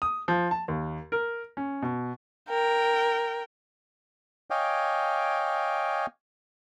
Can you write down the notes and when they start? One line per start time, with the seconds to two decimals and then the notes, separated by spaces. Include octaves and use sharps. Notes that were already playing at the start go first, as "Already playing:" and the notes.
0.02 D#6
0.28 F3
0.51 A5
0.68 D#2
1.12 A#4
1.57 C#4
1.82 B2
2.49 A#4 G5
4.50 C#5 D#5 F5 G5 G#5 D6